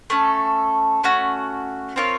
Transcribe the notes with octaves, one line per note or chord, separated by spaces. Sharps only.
A3 C#4 A4
A3 C#4 F#4
C4 F4 A#4 C#5